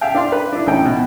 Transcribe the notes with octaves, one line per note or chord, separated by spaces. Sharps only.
E5 F5 G5
D4 F5 C6
B4
D4 E4
A1 C#4 D#4 E4 G5
B2